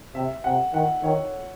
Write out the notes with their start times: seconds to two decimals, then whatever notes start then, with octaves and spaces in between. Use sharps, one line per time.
0.14 C3 E5
0.44 C3 F#5
0.74 D#3 F#5
1.03 D#3 C#5